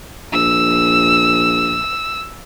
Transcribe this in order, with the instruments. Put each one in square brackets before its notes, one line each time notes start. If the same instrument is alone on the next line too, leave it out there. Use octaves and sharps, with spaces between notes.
[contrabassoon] A#1 [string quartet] E6